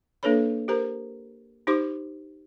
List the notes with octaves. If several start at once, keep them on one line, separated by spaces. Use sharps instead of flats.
A#3 D4 A4 B4 C#5 B5
G4 A#4 C5 A#5
D#4 G4 C5 C6 D6